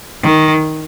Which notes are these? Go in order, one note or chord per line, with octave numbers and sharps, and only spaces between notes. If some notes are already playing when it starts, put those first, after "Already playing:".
D#3